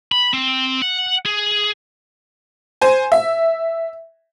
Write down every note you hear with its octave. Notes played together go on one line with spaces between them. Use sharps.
B5
C4
F#5
G#4
C5 G#5
E5